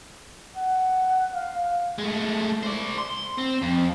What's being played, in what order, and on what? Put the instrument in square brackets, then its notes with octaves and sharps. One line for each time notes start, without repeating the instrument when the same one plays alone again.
[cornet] F#5
F5
[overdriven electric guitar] G#3 A3
C5 D5
C6
C4
F2